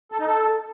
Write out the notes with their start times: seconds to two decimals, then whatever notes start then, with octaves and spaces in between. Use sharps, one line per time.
0.12 A4
0.19 D#4
0.27 A4